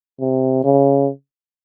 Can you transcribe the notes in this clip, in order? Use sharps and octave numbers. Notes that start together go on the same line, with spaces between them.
C3
C#3